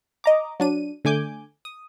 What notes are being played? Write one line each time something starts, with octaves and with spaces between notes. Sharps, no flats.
D#5 A#5 D6
F#3 D4 D#7
D3 A3 G#5 D6 G6
D#6